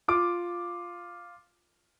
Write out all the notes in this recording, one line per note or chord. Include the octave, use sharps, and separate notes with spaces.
F4 D6